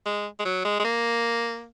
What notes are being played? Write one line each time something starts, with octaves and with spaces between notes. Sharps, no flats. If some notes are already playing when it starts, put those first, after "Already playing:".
G#3
G#3
F#3
G#3
G#3
A#3